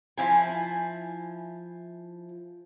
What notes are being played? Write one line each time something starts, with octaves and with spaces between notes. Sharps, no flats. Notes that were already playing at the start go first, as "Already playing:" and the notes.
F3 E4 G#5